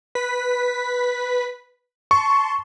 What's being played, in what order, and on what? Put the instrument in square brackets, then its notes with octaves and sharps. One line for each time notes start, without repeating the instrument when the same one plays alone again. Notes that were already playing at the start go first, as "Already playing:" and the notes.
[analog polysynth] B4 B6
[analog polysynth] A5 C6 [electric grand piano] C#6